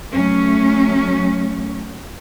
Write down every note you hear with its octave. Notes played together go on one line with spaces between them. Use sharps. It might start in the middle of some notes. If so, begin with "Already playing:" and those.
F#3 A3 C#4